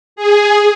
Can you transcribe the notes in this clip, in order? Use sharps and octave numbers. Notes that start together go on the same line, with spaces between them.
G#4